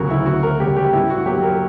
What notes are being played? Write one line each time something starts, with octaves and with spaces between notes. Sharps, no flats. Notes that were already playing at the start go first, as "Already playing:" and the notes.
Already playing: D2 C#3 F#3 F#4 A#4
E4
D2 F#4
A#4
C#3 G3 G4
G4
G2 E4
F#4
F#3 A#3 G4
A#4